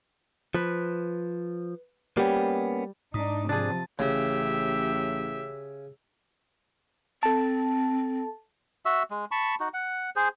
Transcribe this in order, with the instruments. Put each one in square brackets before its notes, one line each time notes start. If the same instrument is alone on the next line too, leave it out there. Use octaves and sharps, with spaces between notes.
[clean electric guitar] F3 [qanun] B4
[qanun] G3 [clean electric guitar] A#3 B3 C#4
[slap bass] G#2 [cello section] D4 D#4 [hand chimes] D#6
[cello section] C3 F3 [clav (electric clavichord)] D4 G#4 [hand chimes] A5 A6
[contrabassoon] A1 [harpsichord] C#3 [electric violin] G4 E5
[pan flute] C4 [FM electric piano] A4 A5
[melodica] F#4 E5 E6
G#3
A5 B5 C#6
D#4 F#4
F#5
G#4 C5